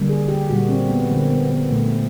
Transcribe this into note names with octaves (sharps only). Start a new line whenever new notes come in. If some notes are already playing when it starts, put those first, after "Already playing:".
Already playing: D3 G3 A#3
G#4
G4
A#2 G3 A#3 F#4
C4
B3
D3 F3 A#3
B3
B3
A#2 F3 A3